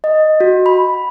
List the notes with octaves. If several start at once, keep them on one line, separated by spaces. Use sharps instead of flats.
D#5
F#4
B5